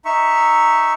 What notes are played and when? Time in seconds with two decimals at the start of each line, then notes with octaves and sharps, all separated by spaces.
0.05 D#4 E5 C#6